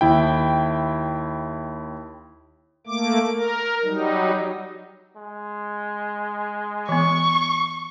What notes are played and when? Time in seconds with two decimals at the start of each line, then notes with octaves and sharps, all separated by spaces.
0.01 D#2 E4 G5
2.87 A3 A#3 D6
3.34 A#4
3.84 F#3 G3 D#4
5.17 G#3
6.89 E3 B3 C#6